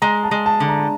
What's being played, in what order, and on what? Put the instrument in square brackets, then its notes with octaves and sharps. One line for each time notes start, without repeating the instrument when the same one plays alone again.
[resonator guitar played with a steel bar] G#3 [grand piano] A#5
[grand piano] A5
[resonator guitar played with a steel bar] G#3
[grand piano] A5
[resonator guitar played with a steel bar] D3
[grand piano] A#5